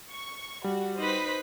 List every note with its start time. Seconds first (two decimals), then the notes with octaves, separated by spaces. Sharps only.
0.10 C#6
0.64 G3 F#4
0.97 D#4 B4 C5 F#6 B6